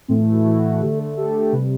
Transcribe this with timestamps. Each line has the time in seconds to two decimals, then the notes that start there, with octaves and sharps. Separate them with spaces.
0.08 A2 E3 A3 C4
0.21 E4
0.32 F#4
0.44 A2 E3 A3 F#4
0.81 D3 A3 G4
0.99 A4
1.17 D3 A3 G4
1.52 C3 B4
1.57 G3